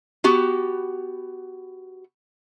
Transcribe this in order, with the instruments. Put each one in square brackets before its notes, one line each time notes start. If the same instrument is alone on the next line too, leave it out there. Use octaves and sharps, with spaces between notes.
[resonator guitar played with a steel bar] B3 F#4 G4